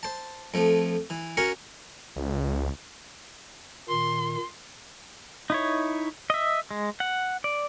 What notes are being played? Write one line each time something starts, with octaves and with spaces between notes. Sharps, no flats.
C5 A5
F2 F3 A3
E3
C#4 F#4 A#4 G#5 C#6
C#2
A#2 D#3 C6
D#4 E4 C#5
D#5 E5
G#3
F#5
D5